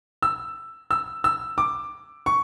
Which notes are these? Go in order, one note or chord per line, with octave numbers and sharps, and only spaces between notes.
E6
E6
E6
D6
C#6